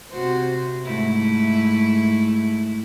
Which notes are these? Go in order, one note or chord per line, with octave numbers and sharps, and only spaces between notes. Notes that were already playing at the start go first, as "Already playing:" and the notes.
C3 F#4 C5
G#2 A3 E4